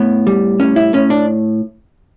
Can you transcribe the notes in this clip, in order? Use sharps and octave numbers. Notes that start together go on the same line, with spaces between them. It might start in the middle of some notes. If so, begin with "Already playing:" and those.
Already playing: A2 B3
G3
A2 C#4
E4
A2 C#4
D4